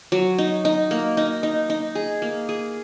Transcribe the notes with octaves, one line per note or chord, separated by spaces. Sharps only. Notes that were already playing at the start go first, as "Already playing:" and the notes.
F#3
D#4
D#4
A#3
D#4
D#4
D#4
G#4
A#3
G#4